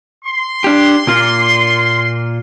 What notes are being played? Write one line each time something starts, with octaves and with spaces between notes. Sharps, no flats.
C6
D4 G4
A#2 F4